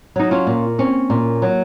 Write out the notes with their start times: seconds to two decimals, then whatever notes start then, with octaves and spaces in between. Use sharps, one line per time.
0.16 F#3 D#4
0.31 C#4 F4
0.47 A#2
0.79 C4 C#4
1.10 A#2
1.42 F#3